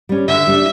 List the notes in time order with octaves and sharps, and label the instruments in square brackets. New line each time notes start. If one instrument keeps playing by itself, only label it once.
[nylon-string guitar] G3 C#4
[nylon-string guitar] D3 [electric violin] E5
[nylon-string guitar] G3 D4